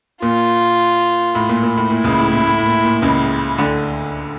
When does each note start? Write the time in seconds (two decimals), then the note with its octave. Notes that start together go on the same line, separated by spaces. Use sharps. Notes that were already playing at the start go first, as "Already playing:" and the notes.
0.22 A#2 F4
1.35 A2
1.49 A#2
1.63 A#2
1.77 A2
1.90 A#2 E4
2.04 C#2 C#3
2.18 A2
2.32 A#2
2.47 A2
2.58 A2
2.66 A#2
2.83 A#2
3.02 C#2 C#3
3.58 D2 D3